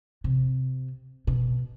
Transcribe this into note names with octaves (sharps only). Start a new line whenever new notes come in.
C3
B2